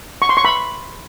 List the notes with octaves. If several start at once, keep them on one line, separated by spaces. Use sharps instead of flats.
C#6
C6
C#6
B5